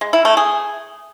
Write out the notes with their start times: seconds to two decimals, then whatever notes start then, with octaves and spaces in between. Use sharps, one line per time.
0.01 G#3
0.13 E4
0.25 A3
0.37 G#4